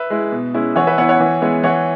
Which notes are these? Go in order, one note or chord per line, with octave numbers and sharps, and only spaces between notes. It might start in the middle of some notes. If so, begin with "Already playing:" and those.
Already playing: B4 E5
G#3 E4
B2
G#3 C#4 E4
E3 C#5 F#5
B4 E5
B3 E4 C#5 F#5
C#5 F#5
E3
G#3 B3 E4
E3 C#5 F#5